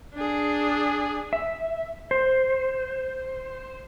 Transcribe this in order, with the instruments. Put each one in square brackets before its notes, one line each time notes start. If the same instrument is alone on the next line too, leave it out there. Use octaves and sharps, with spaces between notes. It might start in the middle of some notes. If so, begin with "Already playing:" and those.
[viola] D4 G#4
[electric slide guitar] E5
C5